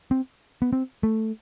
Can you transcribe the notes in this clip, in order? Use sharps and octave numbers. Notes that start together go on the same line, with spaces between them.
C4
B3
C4
A3